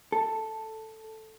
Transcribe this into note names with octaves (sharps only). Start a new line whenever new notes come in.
A4